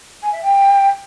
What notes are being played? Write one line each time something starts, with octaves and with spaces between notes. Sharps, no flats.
G#5
E5
G5